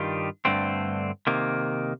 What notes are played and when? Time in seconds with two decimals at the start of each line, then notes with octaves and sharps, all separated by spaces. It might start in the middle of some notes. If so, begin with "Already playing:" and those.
Already playing: G2 D#3 G3 D4 F4
0.45 G2 D3 A3 C4
1.27 C3 D#3 A#3